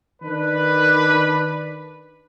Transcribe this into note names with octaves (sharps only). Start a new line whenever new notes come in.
D#3 D4 B4